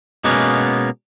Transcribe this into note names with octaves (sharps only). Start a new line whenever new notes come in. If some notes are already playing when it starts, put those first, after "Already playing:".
B2 G#3 A#3 B3 C#4